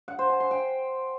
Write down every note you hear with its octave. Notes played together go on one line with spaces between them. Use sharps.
F#5
C5
G#5
C6
G5